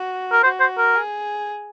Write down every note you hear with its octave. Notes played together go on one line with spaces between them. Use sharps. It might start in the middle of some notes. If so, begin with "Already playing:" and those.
Already playing: F#4
A#4
F#4 C5
C5
A#4
G#4